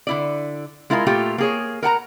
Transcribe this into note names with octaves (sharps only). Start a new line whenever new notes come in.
D3 E4 D5
G#3 E4 F4 A#4 F5 G#5
A#2 A3 F4 G4
A#3 G#4 C#5
A#4 F#5 A5 A#5